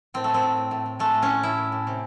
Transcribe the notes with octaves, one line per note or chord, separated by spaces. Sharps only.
A2 C4
A2 A3
C4
A2
A2
A2
A2
G#3 A3
A2
C#4
A2
A2 E4
A2
A2
C3